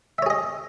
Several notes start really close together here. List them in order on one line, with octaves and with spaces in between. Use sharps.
E5 C#5 G#4 D#5